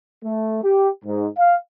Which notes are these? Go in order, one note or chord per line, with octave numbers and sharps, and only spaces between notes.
A3
G4
G#2
F5